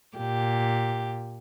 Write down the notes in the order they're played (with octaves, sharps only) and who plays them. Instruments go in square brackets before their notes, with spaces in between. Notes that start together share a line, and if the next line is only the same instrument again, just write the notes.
[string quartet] A#2 G4